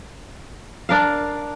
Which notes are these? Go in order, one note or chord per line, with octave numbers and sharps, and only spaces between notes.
D4 A#4 F5